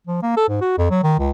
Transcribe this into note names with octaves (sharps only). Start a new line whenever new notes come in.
F3
A#3
A4
G#2
F#4
F2
F#3
D#3
C#2